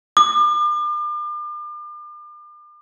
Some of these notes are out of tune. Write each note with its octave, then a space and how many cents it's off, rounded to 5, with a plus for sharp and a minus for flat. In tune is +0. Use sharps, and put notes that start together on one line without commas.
D6 +40